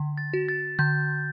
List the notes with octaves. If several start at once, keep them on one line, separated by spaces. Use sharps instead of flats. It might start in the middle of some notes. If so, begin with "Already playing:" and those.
Already playing: D3
A6
F#4
A6
D3 G6